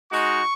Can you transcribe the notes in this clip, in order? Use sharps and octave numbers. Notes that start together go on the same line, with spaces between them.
G#3 D#4 F#4 C#6